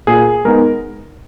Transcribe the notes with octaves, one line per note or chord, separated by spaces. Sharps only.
A#2 G#4
G#3 B3 D#4 A#4